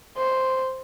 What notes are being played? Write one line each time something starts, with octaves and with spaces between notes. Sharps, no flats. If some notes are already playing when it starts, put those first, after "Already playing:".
C5